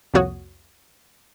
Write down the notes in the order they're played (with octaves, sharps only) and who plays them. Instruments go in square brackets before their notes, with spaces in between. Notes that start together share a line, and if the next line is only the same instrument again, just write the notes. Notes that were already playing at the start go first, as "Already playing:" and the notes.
[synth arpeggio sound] C2 F2 A#3 F#4 C#5 D#6